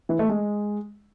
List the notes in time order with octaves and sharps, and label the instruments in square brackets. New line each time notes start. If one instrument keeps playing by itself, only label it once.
[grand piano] E3
A3
G#3